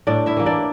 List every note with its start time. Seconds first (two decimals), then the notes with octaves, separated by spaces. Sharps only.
0.07 A2 D4 D5
0.26 E4 E5
0.37 E3 A#3
0.46 D4 D5